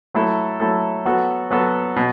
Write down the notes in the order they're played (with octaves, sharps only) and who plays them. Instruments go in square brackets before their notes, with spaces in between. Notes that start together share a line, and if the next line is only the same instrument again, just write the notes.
[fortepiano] F#3 A3 E4 A4
F#3 A3 E4 A4
F#3 B3 F#4 A4
F#3 B3 F#4 A4
B2